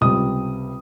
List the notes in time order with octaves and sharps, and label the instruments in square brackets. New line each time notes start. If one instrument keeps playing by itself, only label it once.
[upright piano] C#2 C3 G3 D#6